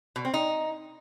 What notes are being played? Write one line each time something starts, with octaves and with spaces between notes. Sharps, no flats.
B2
C4
D#4